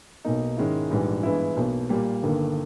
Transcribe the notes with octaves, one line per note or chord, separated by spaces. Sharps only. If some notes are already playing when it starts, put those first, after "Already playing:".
B1 B2 A#3 D#4
G#2 D#3 G#3 C#4 E4
A#1 G#2 E3 G3
G2 E3 G#3 B3 E4
B1 B2 A#3
A#2 G3 A#3
G1 G2 D#3 A#3